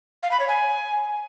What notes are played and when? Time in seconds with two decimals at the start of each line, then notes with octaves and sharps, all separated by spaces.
0.23 F5
0.31 B5
0.40 C#5
0.48 G#5